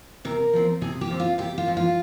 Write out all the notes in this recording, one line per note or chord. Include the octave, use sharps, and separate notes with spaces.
C3 A#4
F3 C4
C3 G#4
G4
F3 C4
F4
C3 G4
F4
F3 C4
F4